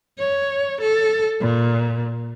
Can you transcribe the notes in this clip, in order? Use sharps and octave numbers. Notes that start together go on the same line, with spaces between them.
C#5
A4
A#2